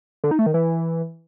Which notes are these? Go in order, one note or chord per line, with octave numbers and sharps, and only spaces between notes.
D3
D#4
A3
D#3
E3